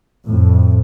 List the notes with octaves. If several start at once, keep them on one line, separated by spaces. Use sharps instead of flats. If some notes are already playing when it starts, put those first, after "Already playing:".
F2 A2